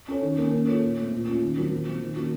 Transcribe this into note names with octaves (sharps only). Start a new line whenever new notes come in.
C#4 A4 C#5
D#3
A#3 C#4
A#3
F4 A4 C#5
A#2
A3 C4
A#2
A3 C#4 F4
D#3
F#3 C4 F#4 A#4
A#2
F3 C4
D#3
A#3 C#4 F#4